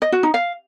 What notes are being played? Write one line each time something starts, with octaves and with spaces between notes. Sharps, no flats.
D#5
F#4
D#4
F5